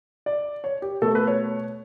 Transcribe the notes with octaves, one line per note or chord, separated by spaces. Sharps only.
D5
C#5
G4
B2 A3 A4
B4
C#5